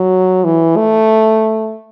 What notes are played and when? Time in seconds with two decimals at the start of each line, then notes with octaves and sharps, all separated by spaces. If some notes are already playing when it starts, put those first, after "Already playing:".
Already playing: F#3
0.44 E3
0.77 A3